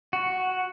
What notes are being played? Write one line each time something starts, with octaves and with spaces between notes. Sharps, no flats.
F#4